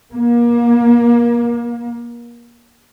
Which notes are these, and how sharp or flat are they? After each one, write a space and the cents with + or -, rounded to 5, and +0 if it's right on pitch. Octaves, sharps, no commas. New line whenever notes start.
A#3 +30